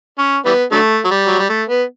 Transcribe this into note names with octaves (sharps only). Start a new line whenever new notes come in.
C#4
E3 G3 B3
D3 F#3 A3
F#3
G3
F#3
G3
A3
B3